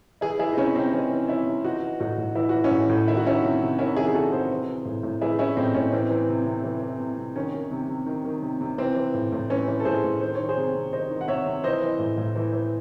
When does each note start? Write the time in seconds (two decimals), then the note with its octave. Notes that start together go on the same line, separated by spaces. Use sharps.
0.21 E3 E4 G#4
0.39 E3 E4 G#4
0.53 D#4
0.57 C3 C#4 E4
0.75 C3 C4 D#4
0.93 E3 C#4
1.11 E3
1.28 C3 C#4 E4
1.47 C3
1.64 E3 D#4 F#4
1.83 E3
2.00 A2 D#4 F#4
2.18 A2
2.35 E3 E4
2.49 E3 F#4
2.64 C#4 E4
2.71 A2
2.89 A2
3.07 D#3 E4
3.17 F#4
3.25 D#3 C#4 E4
3.43 C3
3.61 C3
3.79 D#3 C#4 E4
3.96 D#3 E4 G#4
4.07 G#4
4.14 C3 F#4 A4
4.32 C3 G#4 C5
4.51 E3
4.68 E3
4.85 A2
5.03 A2
5.21 E3 E4 G#4
5.39 E3 C#4 E4
5.57 A2 C4 D#4
5.75 A2 C#4
5.93 E3 C4
6.10 E3
6.29 C3
6.46 C3
6.64 E3
6.81 E3
7.00 C3
7.18 C3
7.35 D#3 C#4
7.54 D#3
7.71 C3
7.89 C3
8.06 D#3
8.25 D#3
8.43 C3
8.61 C3
8.78 E3 C4
8.96 E3
9.14 A2
9.32 A2
9.50 E3 C#4
9.68 E3
9.80 A4
9.85 A2 G#4 C5
10.04 A2
10.21 D#3 C5
10.35 D#3 C#5
10.49 G#4 C5
10.57 C3
10.75 C3
10.93 D#3 C5 D#5
11.10 D#3
11.21 F#5
11.28 C3 C#5 E5
11.46 C3
11.64 E3 C5 D#5
11.82 E3
11.99 A2
12.18 A2
12.36 E3
12.53 E3